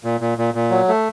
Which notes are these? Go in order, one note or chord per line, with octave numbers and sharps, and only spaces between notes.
A#2
A#2
A#2
A#2
F#3
A3